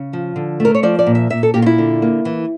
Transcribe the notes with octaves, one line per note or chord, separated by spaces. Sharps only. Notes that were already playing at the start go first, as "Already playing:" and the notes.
Already playing: C#3
F3
D3
A3 A#4
C#5
F3 D5
D5
A#2
E5
A#2 E5
A4
A#2 G4
F4
E4
D3
A#3
E3